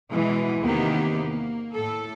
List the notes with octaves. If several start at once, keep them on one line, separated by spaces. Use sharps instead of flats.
B2 E3 G#3
E2 C3 D#3 A#3 B3 G4
A#3
A2 A4